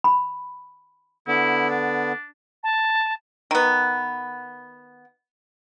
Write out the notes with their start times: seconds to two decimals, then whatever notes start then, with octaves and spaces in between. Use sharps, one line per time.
0.04 B5
1.28 D3 B3 E4
1.70 D4
2.63 A5
3.51 D#3 B3